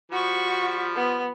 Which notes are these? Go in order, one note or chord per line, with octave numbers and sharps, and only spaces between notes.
F3 G3 F#4 B5 C#6
B3